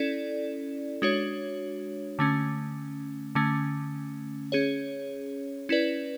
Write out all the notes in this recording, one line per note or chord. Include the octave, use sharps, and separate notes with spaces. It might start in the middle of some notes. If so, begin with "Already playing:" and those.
Already playing: C#4 E4 A4 D5
G#3 D4 F#4 C#5
D3 A3 C#4
D3 A3 C#4
C#4 G#4 C#5
C#4 E4 B4 D5